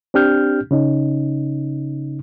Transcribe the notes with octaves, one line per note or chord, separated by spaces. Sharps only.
C4 D4 G4 F6 G6
C#3 C#4 D#4